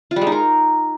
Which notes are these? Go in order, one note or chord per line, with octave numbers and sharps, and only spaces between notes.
F4
G3
G#3
D#4
A#4